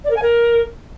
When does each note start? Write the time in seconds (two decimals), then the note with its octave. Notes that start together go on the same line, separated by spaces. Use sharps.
0.04 D5
0.10 A#4
0.16 G#5
0.22 A#4